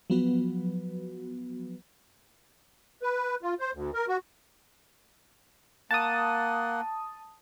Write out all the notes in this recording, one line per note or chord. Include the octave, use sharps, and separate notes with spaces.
F3 F#3 B3 F#4 B4
B4
F4
C5
D2
A#4
F#4
A#3 F#5 A5 D#6